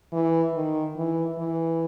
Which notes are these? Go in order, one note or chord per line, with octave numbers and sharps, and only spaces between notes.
E3
D#3
E3
E3